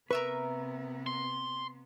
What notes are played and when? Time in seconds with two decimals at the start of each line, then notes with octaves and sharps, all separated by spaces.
0.11 C3 B3 A#4 B4 E5 C#6
1.07 C6